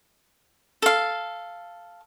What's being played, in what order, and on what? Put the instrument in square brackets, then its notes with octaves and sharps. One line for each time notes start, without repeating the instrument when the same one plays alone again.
[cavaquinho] A4 F5